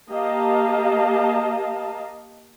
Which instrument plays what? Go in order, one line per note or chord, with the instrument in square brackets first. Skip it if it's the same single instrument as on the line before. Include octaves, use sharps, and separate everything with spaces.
[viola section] A#3 G4 D#5 F5 A5 A#5